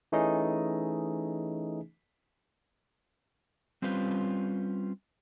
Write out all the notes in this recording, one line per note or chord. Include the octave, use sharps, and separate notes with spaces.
E3 A3 C#4 D#4 G#4 D#5
G3 C4 C#4 F4 B4 C5